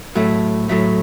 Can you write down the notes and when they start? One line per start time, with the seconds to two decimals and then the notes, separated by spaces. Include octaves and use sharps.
0.15 A2 F#3 A3
0.69 A2 F#3 A3